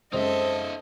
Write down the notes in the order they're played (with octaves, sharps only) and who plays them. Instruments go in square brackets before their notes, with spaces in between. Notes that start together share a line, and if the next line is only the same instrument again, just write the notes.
[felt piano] F#2 G#3 [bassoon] C4 [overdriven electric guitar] D#4 E5 [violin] A4 D#5